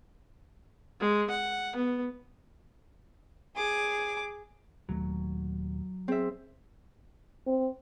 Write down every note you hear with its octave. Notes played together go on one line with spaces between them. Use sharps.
G#3
F#5
B3
G#4 D6
D#1 D#2 F#3 A3
C4 G#4 E5
C4